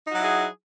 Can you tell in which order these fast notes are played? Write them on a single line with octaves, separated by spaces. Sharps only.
D#4 F#4 F#3 E4 G#4